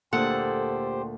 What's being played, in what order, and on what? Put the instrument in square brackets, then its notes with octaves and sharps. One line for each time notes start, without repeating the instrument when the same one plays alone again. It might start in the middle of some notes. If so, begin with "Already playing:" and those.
[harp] D2 A#2 [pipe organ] G4 C5 [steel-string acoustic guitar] A4 [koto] F#5